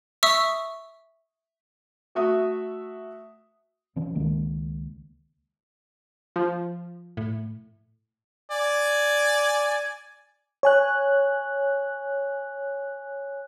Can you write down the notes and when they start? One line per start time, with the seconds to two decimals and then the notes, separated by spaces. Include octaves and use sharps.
0.23 E5 C#6 D#6 E6
2.15 A3 F#4 E5 D#6
3.96 A#1 E3 C4 C#4
4.15 C#2 D#3 G#3 A#3
6.36 F3
7.17 A2
8.51 D5 G#5
10.63 C#5 G#5 F#6